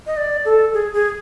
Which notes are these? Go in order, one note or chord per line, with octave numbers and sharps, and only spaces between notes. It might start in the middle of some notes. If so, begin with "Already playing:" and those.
D#5
D5
A4
G#4
G#4